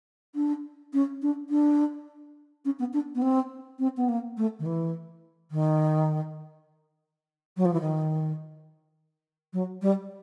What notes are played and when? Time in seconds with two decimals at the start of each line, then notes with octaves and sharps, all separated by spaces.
0.35 D4
0.93 C#4
1.22 D4
1.49 D4
2.65 C#4
2.79 B3
2.93 D4
3.15 B3
3.22 C4
3.79 C4
3.97 B3
4.08 A#3
4.37 A3
4.59 D#3
4.66 E3
5.51 D#3
7.57 F#3
7.65 F3
7.73 E3
7.81 D#3
9.53 F#3
9.82 G3